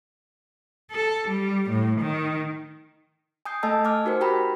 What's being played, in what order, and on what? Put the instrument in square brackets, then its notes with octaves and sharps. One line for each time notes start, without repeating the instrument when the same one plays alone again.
[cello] A4
G3
A2
D#3
[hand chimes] G#5 D#6 G6 C7
A3 A4 D#5 G#5 A5 E6
G#5 D6 F6
D#4 F#4 A#4 C5
G4 A#4 G5 A#5 B5